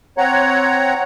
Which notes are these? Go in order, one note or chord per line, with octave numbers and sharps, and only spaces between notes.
C4 C#5 F#5 A#5